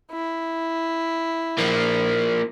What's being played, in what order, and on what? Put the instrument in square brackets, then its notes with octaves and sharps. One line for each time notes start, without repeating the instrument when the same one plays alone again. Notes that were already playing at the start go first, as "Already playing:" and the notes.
[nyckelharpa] E4
[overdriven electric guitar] F3 A#3